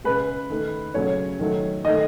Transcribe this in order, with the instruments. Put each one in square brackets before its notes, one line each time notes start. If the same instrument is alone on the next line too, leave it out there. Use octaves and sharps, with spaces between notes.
[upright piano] C#3 G#3 B4
D#3 A3
C#3 F#3 A3 C#5
D#3 F#3 A3
D#3 A3 D#5